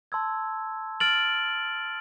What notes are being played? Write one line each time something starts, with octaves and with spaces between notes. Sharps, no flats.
A5 C6 E6 G#6
F6 A6 D7 F#7